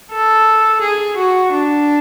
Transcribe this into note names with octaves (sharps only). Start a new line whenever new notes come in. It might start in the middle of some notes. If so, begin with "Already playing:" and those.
A4
G#4
F#4
D4